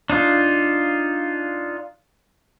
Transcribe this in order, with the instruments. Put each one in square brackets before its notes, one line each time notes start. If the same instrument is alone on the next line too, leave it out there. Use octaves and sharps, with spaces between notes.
[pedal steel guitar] D4 D#4 F4